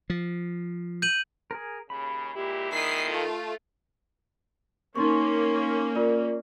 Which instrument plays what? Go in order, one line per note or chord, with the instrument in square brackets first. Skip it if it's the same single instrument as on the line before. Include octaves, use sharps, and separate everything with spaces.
[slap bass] F3
[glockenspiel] G6 D#7 F#7
[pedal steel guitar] G#4 A#4
[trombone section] D#2 C#3 [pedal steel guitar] B5
[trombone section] A#2 G#3 E4 [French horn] G4
[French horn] D#3 [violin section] D#6 B6 C7
[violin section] A3 F4
[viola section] A#3 C#4 [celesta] D#4 C6 C#6
[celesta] F4 A#4 D5